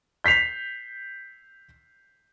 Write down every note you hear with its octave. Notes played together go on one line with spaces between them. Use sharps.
G6 B6 C7 F7